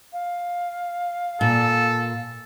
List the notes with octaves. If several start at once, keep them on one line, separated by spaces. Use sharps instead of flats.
F5
A#2 A4